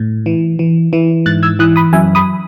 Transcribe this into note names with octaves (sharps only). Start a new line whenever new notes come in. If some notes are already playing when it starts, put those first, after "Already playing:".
Already playing: A2
E3
E3
E3
G#2 F#6 A6
E6 G#6
E3 D#6 F#6
B5 D#6
F#2 E5 G#5
B5 D#6